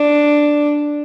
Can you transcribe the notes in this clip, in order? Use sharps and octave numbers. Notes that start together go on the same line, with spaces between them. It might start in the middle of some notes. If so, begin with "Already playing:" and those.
Already playing: D4